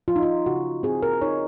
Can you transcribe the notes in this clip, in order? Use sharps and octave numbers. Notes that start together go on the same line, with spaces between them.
F3 F4
D#4
F4
C#3 F#4
C4 G#4
A#4
D#4 C#5